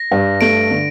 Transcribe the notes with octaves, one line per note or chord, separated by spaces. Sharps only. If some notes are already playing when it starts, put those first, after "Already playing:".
Already playing: A#6
G2
A3 D7
D3